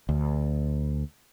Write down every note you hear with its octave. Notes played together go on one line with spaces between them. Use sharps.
D2